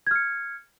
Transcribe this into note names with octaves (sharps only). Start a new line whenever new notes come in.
F6 G#6 C#7